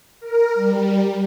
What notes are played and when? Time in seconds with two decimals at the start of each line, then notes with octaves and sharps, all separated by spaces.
0.20 A#4
0.54 G3